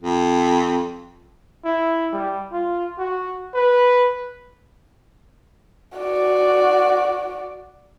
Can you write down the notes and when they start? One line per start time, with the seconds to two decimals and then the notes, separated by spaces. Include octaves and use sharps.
0.03 F2
1.65 E4
2.13 G3
2.52 F4
2.98 F#4
3.55 B4
5.97 F#4 D5